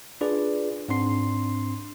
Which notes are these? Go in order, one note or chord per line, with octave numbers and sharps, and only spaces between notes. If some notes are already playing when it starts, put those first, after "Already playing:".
D4 F4 G#4 B4 D5
G#2 C4 D4 C6 C7